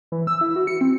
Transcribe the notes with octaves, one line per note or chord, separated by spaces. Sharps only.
E3
E6
E4
F#4
C#7
C4